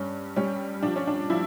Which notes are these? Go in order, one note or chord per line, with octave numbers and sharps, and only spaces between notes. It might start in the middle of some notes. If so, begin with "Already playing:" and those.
Already playing: G2 C#4
G3 C#4
F3 D4
C#4
D4
F3 E4